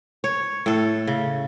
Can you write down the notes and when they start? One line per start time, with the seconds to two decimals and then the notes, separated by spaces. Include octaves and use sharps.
0.24 C#5
0.66 A2 A4
1.07 C#3